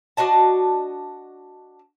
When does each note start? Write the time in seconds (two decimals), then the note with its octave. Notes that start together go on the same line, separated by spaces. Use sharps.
0.17 D4 F#4 D#5 A5